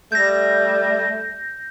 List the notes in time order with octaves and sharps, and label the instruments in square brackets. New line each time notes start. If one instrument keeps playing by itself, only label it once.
[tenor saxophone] G3 [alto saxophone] A3 [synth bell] G6 A#6